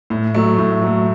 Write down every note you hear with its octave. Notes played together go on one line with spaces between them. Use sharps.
A2
F#3 A3
A2
F#3 A3